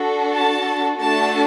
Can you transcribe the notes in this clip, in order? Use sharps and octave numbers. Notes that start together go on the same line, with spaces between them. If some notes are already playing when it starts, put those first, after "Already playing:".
Already playing: D4 F#4 A4
A5
A3 D4 F#4 A4 A5